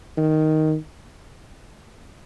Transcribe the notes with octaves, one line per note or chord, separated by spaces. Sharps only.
D#3